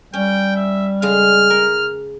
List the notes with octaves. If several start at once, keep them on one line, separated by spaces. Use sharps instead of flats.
G3 C#4 G5
E5
C#3 G#3 F5 F6
A#4